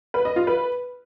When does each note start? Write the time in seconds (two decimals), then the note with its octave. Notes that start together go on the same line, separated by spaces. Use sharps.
0.14 B4
0.25 D#5
0.36 F4
0.47 B4